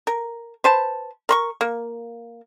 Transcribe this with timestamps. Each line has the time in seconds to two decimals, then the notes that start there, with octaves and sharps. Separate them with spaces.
0.07 A#4
0.64 B4 C5 A5
1.29 A#4 C6 C#6
1.61 A#3